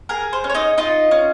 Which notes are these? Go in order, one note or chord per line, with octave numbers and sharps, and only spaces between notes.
G#4 A#4
C5
C#4
C#5
D#4 D#5
D#4 F4 D#5
C#4